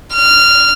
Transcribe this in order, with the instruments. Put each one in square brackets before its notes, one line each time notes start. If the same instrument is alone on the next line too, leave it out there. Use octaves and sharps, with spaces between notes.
[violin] F6